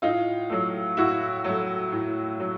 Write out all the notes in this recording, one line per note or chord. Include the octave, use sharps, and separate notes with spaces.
A2 D#4 F4
F#3 A3
A2 E4 F#4
F#3 A3
A2
F#3